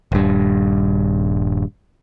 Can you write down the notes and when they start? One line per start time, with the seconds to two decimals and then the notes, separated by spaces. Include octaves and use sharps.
0.12 D#1 G2